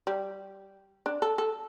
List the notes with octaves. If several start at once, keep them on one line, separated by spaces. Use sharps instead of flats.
G3
D4
A4
A4